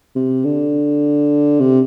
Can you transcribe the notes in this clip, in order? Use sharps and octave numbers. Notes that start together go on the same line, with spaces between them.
C3
D3
C3